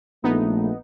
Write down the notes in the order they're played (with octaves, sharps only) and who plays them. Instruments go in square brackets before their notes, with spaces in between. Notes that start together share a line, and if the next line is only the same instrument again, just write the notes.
[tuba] A#1 [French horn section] A3 [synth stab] B3 D#4